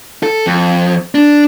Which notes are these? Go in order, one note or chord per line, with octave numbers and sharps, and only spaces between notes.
A4
F2
D4